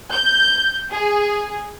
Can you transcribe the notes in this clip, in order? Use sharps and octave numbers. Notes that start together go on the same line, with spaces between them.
G6
G#4